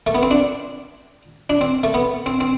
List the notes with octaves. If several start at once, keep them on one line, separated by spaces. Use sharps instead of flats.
A3
B3
C4
D4
D4
C4
A3
B3
C4
C4